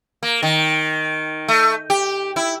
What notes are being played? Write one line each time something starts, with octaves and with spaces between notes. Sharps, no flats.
A#3
D#3
A3
G4
E4